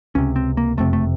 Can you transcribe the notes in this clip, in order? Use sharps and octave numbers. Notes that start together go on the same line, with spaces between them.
C#2 C3 C#4
C4
A#3
F#1 F2 C3 A3
A3